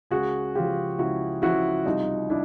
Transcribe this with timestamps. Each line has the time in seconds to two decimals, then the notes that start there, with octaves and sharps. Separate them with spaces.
0.11 C#2 F#4 G#4
0.55 C#3 F3 F4 G4
0.98 C#2 E4 F#4
1.42 C#3 F3 E4 F#4
1.86 C2 D#4 F4
2.30 D4 E4